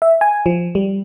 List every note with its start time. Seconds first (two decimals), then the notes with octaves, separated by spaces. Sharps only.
0.02 E5
0.21 G#5
0.46 F3
0.75 G3